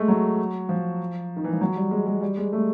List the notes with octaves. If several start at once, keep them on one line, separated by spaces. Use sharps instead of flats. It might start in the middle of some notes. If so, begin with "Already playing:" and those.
Already playing: G#3 A3
F#3
F3
D#3
E3
F3
F#3
G3
G#3
G#3
G3
G#3
A3